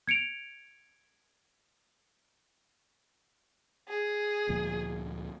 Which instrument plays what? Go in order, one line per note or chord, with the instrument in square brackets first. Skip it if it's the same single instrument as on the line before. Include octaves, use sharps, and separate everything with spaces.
[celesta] G#6 C#7 D7 F7
[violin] G#4
[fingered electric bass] D2 A#2 F3